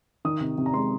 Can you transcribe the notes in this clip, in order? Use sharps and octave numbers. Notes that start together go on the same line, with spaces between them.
D#3 D#6
C3
C3
A#5
G#3 C6